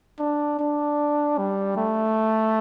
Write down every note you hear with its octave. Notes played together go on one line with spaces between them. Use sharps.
D4
D4
G3
A3